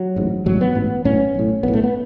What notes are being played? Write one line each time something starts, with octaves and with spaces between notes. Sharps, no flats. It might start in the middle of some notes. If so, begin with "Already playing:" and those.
Already playing: F#3
A1 G#2
A1 G#2 F#3
B3
A1 G#2
B1 A2 C#4
B1 A2
B1 A2 B3
A3
B3